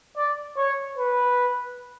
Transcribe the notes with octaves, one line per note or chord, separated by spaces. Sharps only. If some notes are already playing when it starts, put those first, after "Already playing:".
D5
C#5
B4